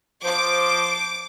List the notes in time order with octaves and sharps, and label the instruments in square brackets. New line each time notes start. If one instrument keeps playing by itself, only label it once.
[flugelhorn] F3 [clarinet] C5 [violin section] D6